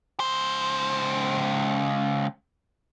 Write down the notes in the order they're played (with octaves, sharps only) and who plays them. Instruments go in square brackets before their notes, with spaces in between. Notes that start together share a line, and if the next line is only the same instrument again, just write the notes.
[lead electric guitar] C#2 C5